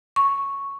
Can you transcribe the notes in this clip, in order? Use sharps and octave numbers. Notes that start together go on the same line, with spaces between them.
C#6